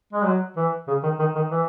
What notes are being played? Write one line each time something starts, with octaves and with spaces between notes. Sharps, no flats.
G#3
F#3
E3
C#3
D#3
D#3
D#3
E3